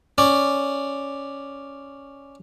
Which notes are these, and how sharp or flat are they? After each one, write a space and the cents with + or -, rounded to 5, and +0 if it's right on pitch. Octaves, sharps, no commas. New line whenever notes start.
C#4 +0 D5 +0